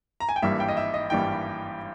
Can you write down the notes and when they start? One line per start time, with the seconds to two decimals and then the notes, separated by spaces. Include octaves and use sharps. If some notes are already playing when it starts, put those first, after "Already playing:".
0.20 A#5
0.29 G#5
0.36 G5
0.42 G#1 G2 E3 G3 A#3 E5
0.60 G5
0.68 D#5
0.77 E5
0.94 D#5
1.10 G#1 G2 E3 G3 A#3 G5